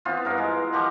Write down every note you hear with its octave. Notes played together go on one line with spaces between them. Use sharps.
E3 B3 C4 F4
G2 A#4
G#3
F3 G4 A#4 F#5